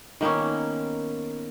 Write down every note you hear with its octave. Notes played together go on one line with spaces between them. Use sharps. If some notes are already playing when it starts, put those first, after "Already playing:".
D#3 A#3 B3 C#4